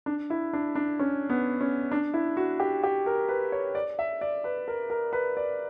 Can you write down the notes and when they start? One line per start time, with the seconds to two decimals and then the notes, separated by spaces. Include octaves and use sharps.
0.06 D4
0.30 E4
0.53 D4
0.75 D4
0.99 C#4
1.30 B3
1.61 C#4
1.92 D4
2.14 E4
2.37 F#4
2.60 G4
2.83 G4
3.06 A#4
3.29 B4
3.52 C#5
3.75 D5
3.99 E5
4.21 D5
4.44 B4
4.68 A#4
4.90 A#4
5.13 B4
5.37 D5